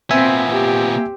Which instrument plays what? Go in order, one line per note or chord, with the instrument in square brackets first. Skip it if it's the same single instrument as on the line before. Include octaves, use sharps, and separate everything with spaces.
[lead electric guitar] A#2 B3 [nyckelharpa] C4 [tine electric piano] E5 G#5
[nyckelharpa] C4 G4